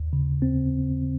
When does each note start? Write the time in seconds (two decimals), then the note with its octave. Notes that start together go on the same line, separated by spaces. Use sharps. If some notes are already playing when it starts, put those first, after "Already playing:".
Already playing: D#2
0.13 C#3
0.42 C4